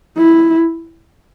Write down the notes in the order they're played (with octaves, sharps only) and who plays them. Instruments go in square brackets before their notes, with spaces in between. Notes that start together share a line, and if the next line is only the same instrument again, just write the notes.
[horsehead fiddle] E4